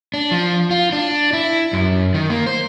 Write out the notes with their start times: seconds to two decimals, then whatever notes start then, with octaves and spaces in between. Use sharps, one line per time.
0.14 D4
0.31 F3
0.71 F4
0.92 D4
1.33 E4
1.73 F#2
2.14 D#3
2.30 A#3
2.47 C5